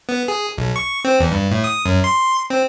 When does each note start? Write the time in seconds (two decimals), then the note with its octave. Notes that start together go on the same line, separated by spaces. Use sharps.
0.09 B3
0.28 G#4
0.58 B1
0.76 C#6
1.05 C4
1.20 E2
1.32 G2
1.51 A2
1.64 D#6
1.85 F#2
2.04 C6
2.50 C4